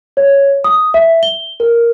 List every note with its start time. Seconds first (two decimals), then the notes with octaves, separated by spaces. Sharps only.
0.17 C#5
0.64 D#6
0.94 E5
1.23 G7
1.60 A#4